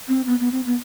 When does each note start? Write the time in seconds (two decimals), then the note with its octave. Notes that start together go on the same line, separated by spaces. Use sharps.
0.08 C4
0.27 B3
0.40 B3
0.52 C4
0.66 B3